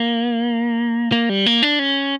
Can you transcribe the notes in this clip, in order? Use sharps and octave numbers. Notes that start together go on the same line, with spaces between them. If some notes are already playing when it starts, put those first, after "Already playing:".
Already playing: A#3
A#3
G3
A#3
D4
C#4